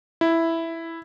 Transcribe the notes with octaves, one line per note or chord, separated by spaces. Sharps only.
E4